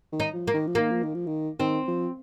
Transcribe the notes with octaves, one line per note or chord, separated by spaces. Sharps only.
D#3
D#4
F3
A#3
D#3
F3
D#3 A#3
F3
D#3
F3
D#3
D#3 C4
F3